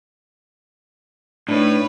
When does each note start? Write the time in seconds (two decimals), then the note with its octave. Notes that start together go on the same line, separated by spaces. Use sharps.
1.49 A2 D4 D#4 B4 C#5